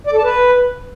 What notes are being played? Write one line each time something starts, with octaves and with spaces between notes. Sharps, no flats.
D5
A4
A5
B4